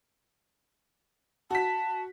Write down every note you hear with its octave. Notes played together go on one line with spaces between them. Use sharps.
F#4 A5 B6